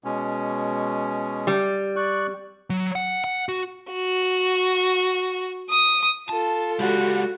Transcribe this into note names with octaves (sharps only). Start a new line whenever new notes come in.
B2 G#3 C#4
G3
D5 C#6 F#6
F#3
F#5
F#5
F#4
F#4
D#6
F4 A4 A5
G#3 F#4 G4